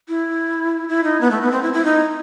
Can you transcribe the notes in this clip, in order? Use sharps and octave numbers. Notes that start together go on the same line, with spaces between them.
E4
E4
D#4
B3
A3
B3
C4
E4
E4
D#4